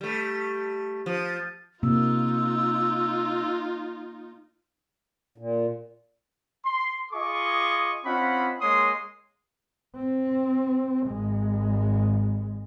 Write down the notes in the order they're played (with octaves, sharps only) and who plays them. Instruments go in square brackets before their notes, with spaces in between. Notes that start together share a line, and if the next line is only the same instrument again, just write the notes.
[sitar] G3 A3
F3
[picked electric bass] C3 [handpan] A#3 [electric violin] D#4 F4 [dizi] E6
[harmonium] A#2
[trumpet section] C6
F4 G#4 D#5 C#6 D6
C4 C#4 F4 D#5 F#5 B5
G#3 A#3 C#5 C6 D#6
[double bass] C4
G#1 G#3